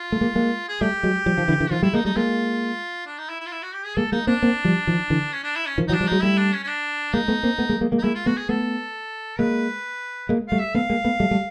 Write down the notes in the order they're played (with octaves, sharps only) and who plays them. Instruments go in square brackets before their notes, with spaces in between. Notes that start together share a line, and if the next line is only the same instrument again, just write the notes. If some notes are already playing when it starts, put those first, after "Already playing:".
Already playing: [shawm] F4
[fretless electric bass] A3
G#3 A#3
G#3 A#3
[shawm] G#4
[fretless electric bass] G3 A3 [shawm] G4
[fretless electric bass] F#3 G#3
F3 G3
D#3 F3
D3 E3
D3 E3
[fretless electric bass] D#3 F3 [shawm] F4
[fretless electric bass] G3 A3 [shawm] E4
[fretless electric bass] G#3 A#3 [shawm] D#4
[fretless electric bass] G3 A3 [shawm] D#4
[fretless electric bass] G#3 A#3 [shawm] F4
[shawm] D4
D#4
E4
E4
F4
E4
F#4
G4
G#4
[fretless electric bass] G#3 A#3 [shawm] A4
[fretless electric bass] G#3 A#3 [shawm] D#4
[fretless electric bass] A#3 C4 [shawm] D4
[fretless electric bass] A#3 C4
F3 G3
D#3 F3
D3 E3
[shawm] C#4
D4
E4
C#4
[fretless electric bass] D#3 F3
[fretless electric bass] E3 F#3 [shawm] D#4
[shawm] D4
[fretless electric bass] F3 G3
[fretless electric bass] F#3 G#3 [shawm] D#4
[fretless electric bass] G3 A3 [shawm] E4
[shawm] D4
C#4
C#4
D4
[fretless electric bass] G#3 A#3 [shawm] D#4
[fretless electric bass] A3 B3
A#3 C4
A3 B3
G#3 A#3
G#3 A#3
G#3 A#3
[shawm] D#4
[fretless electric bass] G#3 A#3 [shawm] E4
[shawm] F4
[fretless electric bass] A3 B3 [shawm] F#4
[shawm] G#4
[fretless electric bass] A3 B3 [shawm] A4
[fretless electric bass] G#3 A#3 [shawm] B4
[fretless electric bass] G#3 A#3
[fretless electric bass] G3 A3 [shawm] F5
[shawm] E5
[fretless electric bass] A3 B3 [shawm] F5
[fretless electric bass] G#3 A#3
A3 B3
G3 A3
G3 A3